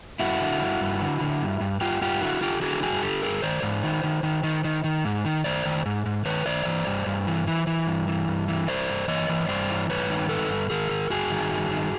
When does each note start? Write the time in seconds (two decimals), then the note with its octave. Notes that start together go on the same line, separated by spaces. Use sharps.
0.20 G2 E4 F#4
0.40 D3
0.60 G2
0.81 G2
1.01 D3
1.21 D3
1.41 G2
1.60 G2
1.81 G2 F4 G4
2.01 G2 F4 G4
2.21 D3 E4 F#4
2.41 D3 F4 G4
2.62 D3 F#4 G#4
2.83 G2 F#4 G#4
3.02 D3 G4 A4
3.22 G2 G#4 A#4
3.42 D#3 C5 D5
3.62 G#2
3.84 D#3
4.04 D#3
4.23 D#3
4.43 D#3
4.64 D#3
4.84 D#3
5.05 G#2
5.25 D#3
5.44 D#3 C5 D5
5.65 D#3
5.86 G#2
6.06 G#2
6.25 D#3 B4 C#5
6.46 D#3 C5 D5
6.66 E3
6.87 G2
7.06 G2
7.27 E3
7.47 E3
7.67 E3
7.87 G2
8.08 E3
8.28 G2
8.48 E3
8.68 G2 C5 D5
8.89 G2
9.08 E3 C#5 D#5
9.29 E3
9.48 G2 C5 D5
9.70 E3
9.89 G2 B4 C#5
10.10 D#3
10.29 G2 A4 B4
10.50 G2
10.70 D#3 G#4 A#4
10.91 D#3
11.10 G2 F#4 G#4
11.31 D#3
11.51 G2
11.71 D#3